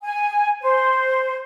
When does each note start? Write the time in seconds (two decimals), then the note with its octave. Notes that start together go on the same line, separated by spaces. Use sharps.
0.03 G#5
0.62 C5